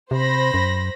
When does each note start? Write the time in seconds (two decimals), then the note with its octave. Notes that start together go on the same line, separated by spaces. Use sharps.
0.11 C3 C5 B5 A#6
0.54 F#2